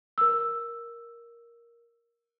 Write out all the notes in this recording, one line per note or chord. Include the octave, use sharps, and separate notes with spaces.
A#4 E6